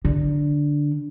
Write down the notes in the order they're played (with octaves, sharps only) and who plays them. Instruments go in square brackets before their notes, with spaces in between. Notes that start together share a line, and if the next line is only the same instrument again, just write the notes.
[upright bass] D3